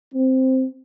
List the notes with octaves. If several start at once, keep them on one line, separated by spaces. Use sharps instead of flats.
C4